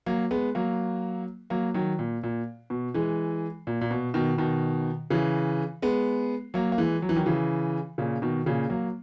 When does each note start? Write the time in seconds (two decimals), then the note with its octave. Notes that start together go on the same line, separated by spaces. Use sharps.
0.06 F#3 A#3
0.31 G#3 B3
0.55 F#3 A#3
1.50 F#3 A#3
1.74 D#3 F#3
1.99 A#2
2.23 A#2
2.70 B2
2.94 E3 G#3
3.67 A#2
3.81 A#2
3.91 B2
4.14 B2 D#3
4.38 B2 D#3
5.10 C#3 E3
5.82 G#3 B3
6.54 F#3 A#3
6.72 A#3
6.78 E3 G#3
7.02 F#3
7.09 E3
7.16 D#3 F#3
7.26 C#3 E3
7.98 A#2 C#3
8.22 B2 D#3
8.46 A#2 C#3
8.70 F#3 A#3